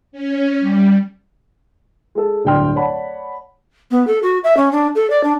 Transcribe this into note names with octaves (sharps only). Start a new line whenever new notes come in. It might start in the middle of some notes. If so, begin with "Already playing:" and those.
C#4
G3
G#3 A4
D1 G2 D5 G5 C6 F6
C#5 D5 F#5 A5 B5
B3
A4
F#4
E5
C#4
D4
A4
D5
D4